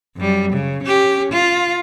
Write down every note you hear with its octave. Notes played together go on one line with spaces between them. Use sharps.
F#2 G3
C#3
C#4 G4
F4